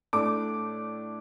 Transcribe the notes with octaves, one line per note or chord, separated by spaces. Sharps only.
A2 A3 D4 D6